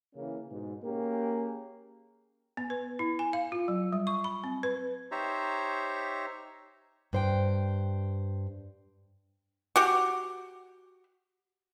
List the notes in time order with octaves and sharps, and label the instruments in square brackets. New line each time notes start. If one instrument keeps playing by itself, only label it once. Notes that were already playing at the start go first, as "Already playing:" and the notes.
[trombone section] C#3 E3 A#3 C#4
G#2 B2
A#3 C#4 G4 G#4
[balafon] B3
B4
E4
G#5
F5
F4
F#3
G3
C#6
B5
C4
B4
[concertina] D#4 G4 C5 C#5 E5 A#5
[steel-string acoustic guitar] G2 C5 G5
[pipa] F#4 G4